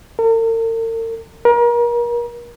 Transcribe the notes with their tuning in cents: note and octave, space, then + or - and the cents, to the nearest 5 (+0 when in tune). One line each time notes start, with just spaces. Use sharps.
A#4 -45
A#4 +35